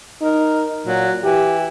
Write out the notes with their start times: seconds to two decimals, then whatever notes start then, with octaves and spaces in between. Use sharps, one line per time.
0.22 D#4 A#4
0.86 A#2 F#3
1.24 E3 G4